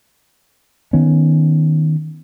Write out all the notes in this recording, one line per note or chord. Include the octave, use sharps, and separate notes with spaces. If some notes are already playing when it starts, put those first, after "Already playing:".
D#3 B3 C#4